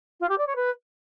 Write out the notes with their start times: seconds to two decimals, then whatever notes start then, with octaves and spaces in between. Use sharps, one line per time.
0.20 F4
0.29 G4
0.38 D5
0.47 C#5
0.56 B4